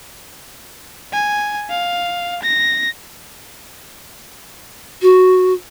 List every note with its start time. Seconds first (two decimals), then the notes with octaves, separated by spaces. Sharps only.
1.12 G#5
1.70 F5
2.43 A#6
5.02 F#4